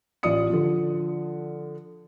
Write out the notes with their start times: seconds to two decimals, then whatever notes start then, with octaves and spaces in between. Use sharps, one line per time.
0.23 A1 F4 D5 D#6 C#7
0.50 D3 F3